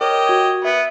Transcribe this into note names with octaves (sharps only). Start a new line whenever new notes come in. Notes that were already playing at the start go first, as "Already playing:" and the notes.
G4 A#4 C#5 D#5
F#4 G#6
B3 E5